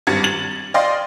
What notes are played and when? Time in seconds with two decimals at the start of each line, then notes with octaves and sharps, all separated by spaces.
0.07 G#1 G2 G#6 A6 C#7
0.23 A6 F#7
0.74 D5 D#5 F5 G5 C6